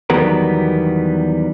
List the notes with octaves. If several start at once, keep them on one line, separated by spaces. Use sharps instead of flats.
E2 D#3 F#3 G3 B3 A#4